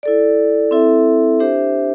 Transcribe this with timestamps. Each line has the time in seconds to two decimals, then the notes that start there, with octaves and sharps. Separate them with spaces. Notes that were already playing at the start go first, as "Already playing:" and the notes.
0.03 E4 A4 D5
0.71 C4 E4 A4 E5
1.39 D4 G4 C5 E5